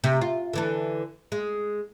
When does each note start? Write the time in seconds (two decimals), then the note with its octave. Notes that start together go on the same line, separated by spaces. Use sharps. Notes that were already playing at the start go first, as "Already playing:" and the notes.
0.04 C3 G4
0.21 F4
0.53 D3 E3 A4
1.32 G#3